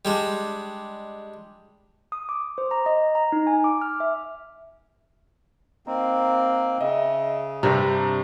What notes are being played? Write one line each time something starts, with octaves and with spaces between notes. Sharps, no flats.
G3 G#3 D4
D#6
D6
C5
A#5
D#5
A#5
D#4
G#5
D6
F6
E5
A#3 C4 D#4
C#3 D#5 E5
G2 C3 D4 A#4 B4 A#5